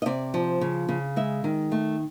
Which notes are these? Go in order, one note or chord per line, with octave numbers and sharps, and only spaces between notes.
D#5
C3 D5
F3
C#3
C#3
G#3 E5
D#3
A3